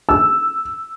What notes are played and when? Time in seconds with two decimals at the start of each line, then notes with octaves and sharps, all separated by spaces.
0.09 E6